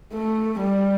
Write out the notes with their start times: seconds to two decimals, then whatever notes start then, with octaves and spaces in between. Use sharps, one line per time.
0.13 A3
0.61 G3